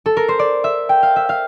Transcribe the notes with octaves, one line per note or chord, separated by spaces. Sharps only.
A4
A#4
C5
D5
E5
G5
F5
E5
F5